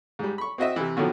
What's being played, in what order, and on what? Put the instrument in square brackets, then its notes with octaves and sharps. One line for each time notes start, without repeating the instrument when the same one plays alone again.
[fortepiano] G#2 G3
B5 C#6
C4 F#4 D#5 E5
C3 E3
B2 D3 D#3 F3 F#3